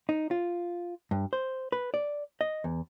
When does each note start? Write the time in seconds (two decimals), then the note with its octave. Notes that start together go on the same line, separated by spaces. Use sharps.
0.09 D#4
0.31 F4
1.11 G2
1.33 C5
1.72 B4
1.94 D5
2.41 D#5
2.64 E2